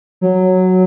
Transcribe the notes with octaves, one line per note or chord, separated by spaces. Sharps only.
F#3